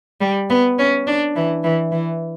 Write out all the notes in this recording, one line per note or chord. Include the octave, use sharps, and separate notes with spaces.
G3
B3
C#4
D4
E3
E3
E3